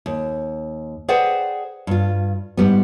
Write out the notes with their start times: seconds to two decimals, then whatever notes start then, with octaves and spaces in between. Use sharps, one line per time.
0.06 D#2
1.08 G#4 B4 C5 D5 F#5 G5
1.87 G2 F4
2.57 G#2 G3 B3